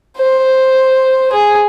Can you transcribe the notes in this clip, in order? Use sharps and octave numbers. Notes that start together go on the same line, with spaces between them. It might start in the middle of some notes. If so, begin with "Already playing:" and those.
C5
G#4